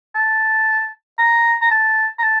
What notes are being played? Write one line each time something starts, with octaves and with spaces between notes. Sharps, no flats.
A5
A#5
A#5
A5
A#5
A5